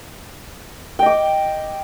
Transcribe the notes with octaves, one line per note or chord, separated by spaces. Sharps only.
D#5 G5 D6